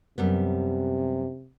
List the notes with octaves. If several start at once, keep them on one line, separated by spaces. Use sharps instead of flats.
F#2 C3 G3 B3